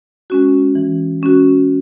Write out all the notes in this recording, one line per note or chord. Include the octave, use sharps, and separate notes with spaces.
G#3 C#4 F#4
E3
G#3 C#4 F#4